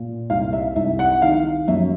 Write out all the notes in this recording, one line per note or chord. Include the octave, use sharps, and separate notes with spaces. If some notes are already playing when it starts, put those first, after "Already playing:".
Already playing: A#2
C2 F5
E5
C2 E5
F#5
D#3 F5
F#2 E5